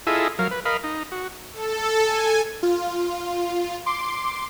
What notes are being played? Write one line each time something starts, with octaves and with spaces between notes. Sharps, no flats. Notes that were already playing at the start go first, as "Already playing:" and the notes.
E4 F4 G#4 A4 D#5 E5
F#3 A#4 F5
B4
A#4 D#5 F5 B5
D#4
F#4
A4
G#5
F4
C6 D6